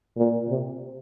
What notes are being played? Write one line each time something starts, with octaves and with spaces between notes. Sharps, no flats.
A#2
C3